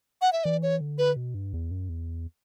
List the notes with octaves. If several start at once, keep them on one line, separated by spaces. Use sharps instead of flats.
F#5
E5
E3 D5
C#5
D3
B4
B2
G2
E2
F#2
E2